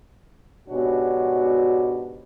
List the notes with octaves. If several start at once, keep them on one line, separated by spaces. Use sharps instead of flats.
G#2 B2 D4 F#4 G4 C#5